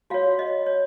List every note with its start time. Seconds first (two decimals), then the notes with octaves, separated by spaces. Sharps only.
0.10 F4 F#4 C#5 F5
0.39 D#5
0.66 C#5